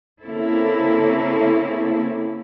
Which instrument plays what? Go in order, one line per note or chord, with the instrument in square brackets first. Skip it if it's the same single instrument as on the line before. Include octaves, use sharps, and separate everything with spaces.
[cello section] C#3 A#3 C4 E4 A4